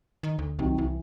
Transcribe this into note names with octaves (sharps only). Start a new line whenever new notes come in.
D#3
D2
C2 C3 D#3 F#3
C2 E3